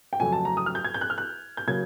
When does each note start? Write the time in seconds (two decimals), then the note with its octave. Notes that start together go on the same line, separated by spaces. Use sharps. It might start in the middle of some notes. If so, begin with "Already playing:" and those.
0.13 G5
0.20 F2 C#3 F#3 A3 G#5
0.32 A5
0.45 A#5
0.57 D#6
0.66 F6
0.75 G6
0.85 G#6
0.94 G6
1.01 F#6
1.10 F6
1.18 F#6
1.57 G6
1.67 C#3 F#3 A#3 G#6